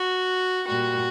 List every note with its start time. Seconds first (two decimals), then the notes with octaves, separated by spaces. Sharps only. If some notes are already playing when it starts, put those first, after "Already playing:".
Already playing: F#4
0.66 A#2 G3 F#4